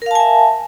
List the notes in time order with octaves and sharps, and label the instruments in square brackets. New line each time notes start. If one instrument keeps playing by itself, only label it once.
[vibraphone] A#4
F5
A5
G#5
E5